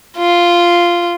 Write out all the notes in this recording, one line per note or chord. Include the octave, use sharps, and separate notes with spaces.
F4